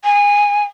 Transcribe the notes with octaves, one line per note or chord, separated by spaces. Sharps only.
G#5